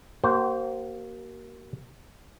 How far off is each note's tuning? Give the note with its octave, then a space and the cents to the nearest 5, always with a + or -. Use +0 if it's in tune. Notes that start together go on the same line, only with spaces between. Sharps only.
A#3 +5 F#4 +45 C5 +0